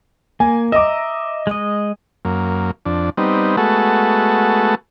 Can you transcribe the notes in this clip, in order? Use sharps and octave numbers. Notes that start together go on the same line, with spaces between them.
A#3 G#5
D#5 E5 A#5 D6
G#3 D#5
F#2 A#3
F2 D4
G3 B3 C4 D#4
G#3 A3 B3 F#4 A4